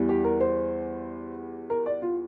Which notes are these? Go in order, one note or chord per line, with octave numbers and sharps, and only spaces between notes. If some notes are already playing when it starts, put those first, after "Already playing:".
Already playing: E2 E3 G3
G4
A#4
C5
A#4
D5
F4